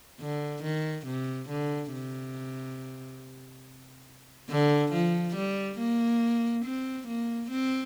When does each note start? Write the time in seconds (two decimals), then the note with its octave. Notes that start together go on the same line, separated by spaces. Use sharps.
0.20 D3
0.63 D#3
1.07 C3
1.49 D3
1.93 C3
4.50 D3
4.92 F3
5.36 G3
5.78 A#3
6.64 C4
7.07 A#3
7.50 C4